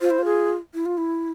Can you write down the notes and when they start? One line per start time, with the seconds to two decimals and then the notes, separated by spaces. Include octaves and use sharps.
0.01 F4 C5
0.10 E4
0.18 F4
0.25 G#4
0.74 E4
0.86 F4
0.98 E4